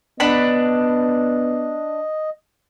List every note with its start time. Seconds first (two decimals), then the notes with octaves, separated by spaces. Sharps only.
0.20 B3 D4 D#5 F#5 B5